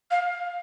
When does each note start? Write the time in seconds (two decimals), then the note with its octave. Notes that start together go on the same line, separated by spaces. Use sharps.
0.10 F5